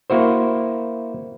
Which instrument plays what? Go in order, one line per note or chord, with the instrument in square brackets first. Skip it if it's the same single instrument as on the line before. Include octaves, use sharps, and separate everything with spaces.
[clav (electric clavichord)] A#3 E4 F#4 C5